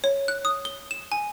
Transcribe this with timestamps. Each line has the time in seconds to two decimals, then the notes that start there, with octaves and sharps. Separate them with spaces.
0.04 C#5
0.28 F#6
0.45 D#6
0.65 G7
0.91 E7
1.12 G#5